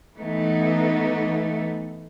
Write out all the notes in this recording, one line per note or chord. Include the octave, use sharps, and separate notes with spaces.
E3 A3 B3 D#4